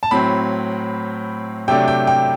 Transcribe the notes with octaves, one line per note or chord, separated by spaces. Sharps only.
A5
A2 F#3 C4 B5
C3 F#3 A3 D4 G5
G5
G5